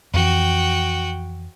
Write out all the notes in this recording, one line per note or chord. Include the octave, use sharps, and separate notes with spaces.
F2 E3 F#4 G5